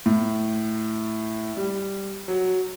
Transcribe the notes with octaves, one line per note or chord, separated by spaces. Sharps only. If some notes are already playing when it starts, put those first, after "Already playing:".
A2
G3
F#3